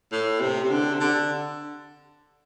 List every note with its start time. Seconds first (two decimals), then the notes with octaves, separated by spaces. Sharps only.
0.12 A2
0.41 C3
0.64 C3
0.70 D3
0.94 C3
1.00 D3